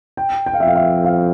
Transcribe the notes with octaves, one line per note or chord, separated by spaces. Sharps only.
G5
G5
F5
F2 E5
F5
E5
F5